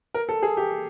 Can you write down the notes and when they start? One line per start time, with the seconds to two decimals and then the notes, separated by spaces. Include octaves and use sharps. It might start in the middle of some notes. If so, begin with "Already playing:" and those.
0.14 A#4
0.29 A4
0.43 G#4
0.57 G4